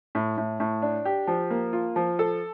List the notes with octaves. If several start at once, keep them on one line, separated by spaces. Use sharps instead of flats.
A2
A2
A2
D4
G4
F3
A#3
F4
F3
A4